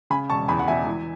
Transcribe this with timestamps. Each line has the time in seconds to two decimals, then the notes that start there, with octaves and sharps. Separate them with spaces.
0.10 C#3 G#5 B5
0.29 E1 A5 C#6
0.48 E2 G#5 B5
0.59 F#5
0.67 E1 E5 G#5
0.87 E3